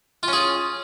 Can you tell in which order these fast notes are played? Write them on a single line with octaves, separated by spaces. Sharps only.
F4 C#4 G#4